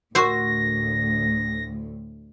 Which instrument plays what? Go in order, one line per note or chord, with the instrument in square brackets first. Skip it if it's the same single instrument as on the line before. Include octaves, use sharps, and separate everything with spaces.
[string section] D2 A2 [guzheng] F#4 C5 [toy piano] A#4 C#6 [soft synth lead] A#6